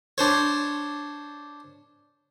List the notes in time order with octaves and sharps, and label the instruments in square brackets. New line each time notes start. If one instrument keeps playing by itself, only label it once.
[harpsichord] D4 C5 C#5